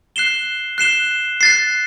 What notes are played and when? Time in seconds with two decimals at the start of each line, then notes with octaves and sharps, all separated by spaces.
0.16 F#6 C7 E7 G7
0.78 F#6 C7 E7 G7
1.41 F#6 A6 C7